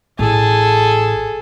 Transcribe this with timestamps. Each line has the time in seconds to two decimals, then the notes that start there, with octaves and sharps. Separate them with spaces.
0.19 A1 G#4 A4